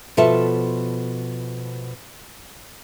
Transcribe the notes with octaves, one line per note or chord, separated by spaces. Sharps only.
B2 F3 F4 A4 E5 A5